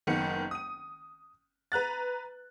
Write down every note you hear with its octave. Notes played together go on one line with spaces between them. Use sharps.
F#1 D#3 B3 C#7
D#6 D#7
B4 A#5 F#6 A6